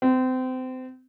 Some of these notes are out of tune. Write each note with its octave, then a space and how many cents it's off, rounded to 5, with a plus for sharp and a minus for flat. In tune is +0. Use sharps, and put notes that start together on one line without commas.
C4 -30